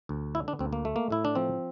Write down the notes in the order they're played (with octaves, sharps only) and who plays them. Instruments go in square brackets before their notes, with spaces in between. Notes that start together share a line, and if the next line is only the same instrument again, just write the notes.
[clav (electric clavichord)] D2
D3 E4
D4
D2 C4
A#3
A3
A#3
A2 E4
D4
F3 C4